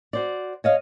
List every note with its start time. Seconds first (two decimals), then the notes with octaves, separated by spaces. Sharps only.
0.13 F#4 C5 D5
0.64 C#5 D#5 F5